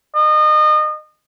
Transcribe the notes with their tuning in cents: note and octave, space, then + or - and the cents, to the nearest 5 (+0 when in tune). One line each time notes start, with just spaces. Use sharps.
D#5 -30